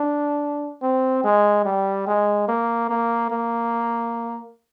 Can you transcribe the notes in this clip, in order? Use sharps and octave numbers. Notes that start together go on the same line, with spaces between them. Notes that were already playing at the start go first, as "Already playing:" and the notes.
Already playing: D4
C4
G#3
G3
G#3
A#3
A#3
A#3